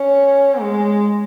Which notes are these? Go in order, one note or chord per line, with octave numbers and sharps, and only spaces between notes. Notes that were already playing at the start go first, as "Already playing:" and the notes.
Already playing: C#4
G#3